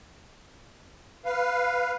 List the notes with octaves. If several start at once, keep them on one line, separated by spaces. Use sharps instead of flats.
B4 F5